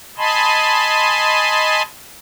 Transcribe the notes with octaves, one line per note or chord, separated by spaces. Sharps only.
D#5 G#5 A5 B5 C6